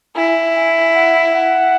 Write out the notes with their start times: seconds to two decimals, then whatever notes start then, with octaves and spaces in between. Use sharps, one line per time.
0.16 E4 G#5
0.55 G#5
0.95 F#5
1.34 F#5